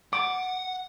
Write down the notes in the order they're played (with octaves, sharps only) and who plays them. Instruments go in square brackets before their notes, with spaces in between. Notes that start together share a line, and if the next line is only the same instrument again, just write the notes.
[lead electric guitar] F#5 [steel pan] D6